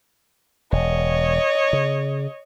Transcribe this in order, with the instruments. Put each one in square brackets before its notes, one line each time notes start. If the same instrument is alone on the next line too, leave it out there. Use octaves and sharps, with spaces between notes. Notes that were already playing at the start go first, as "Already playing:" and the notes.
[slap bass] E1 [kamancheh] C#5 D#5
[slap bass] C#3